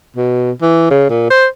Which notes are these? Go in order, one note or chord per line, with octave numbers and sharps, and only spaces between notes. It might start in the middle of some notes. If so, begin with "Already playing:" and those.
B2
E3
C#3
A#2
C5